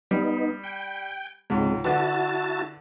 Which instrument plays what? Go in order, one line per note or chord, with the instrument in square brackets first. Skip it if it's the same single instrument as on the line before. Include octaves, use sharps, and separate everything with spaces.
[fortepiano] G3 [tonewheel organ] B3 D#4
[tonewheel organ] G5
[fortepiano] C#2 G#2 [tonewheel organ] C3 G#3
[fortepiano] D3 B4 [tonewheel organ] E4 F#4 A5